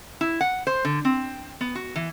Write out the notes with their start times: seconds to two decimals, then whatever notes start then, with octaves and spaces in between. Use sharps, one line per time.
0.21 E4
0.41 F#5
0.67 C5
0.85 D3
1.05 C4
1.61 B3
1.75 F#4
1.96 E3